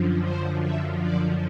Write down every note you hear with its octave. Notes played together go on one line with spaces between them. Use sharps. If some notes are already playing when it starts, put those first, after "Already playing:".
Already playing: F#2 D3 F3
C5
E5
D5